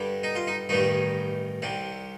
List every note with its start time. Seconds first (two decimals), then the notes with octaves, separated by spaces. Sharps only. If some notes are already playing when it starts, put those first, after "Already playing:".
Already playing: G2 D3 G3
0.23 D#4
0.35 F4
0.47 D#4
0.69 A1 G2 D#3 G3 D#4
1.62 C2 C3 G3